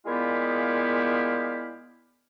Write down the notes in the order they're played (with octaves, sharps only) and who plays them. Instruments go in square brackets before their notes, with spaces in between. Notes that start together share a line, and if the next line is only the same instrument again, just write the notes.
[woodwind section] A#2 G#3 B3 E4 G4 F5